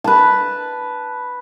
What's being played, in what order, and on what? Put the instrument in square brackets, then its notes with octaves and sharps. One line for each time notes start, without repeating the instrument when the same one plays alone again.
[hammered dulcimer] B4 A5